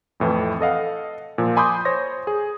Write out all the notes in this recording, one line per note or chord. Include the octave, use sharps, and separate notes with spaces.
F2 A2 E3
A4 D#5 F5 F#5
A#2 F3
G#5 B5 C6 D6 D#6 G6
C5 C#5 A#6
G#4